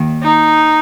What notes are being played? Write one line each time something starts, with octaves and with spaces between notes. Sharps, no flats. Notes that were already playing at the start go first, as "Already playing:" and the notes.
Already playing: D#2 D#3 A#3
D#4